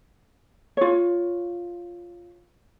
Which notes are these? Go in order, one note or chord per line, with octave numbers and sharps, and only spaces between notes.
F4 C#5